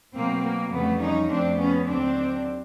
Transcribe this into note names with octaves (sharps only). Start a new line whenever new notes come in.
B2 F#3 A3 A#3 C4
A#3
F2 C#3 E3 G3 A3 B3
C#4 D#4
F2 C#3 F3 A3 C4 D4
B3 C#4
D#2 D3 F#3 C4 D4